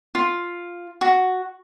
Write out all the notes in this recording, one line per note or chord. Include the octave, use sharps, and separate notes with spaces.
F4
F#4